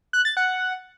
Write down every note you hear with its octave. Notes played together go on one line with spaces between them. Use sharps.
F#6
A6
F#5